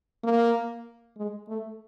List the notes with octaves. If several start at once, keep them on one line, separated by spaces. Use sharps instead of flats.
A#3
G#3
A3